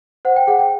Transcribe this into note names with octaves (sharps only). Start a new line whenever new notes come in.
C5 F#5
G5
G#4 F#5
G5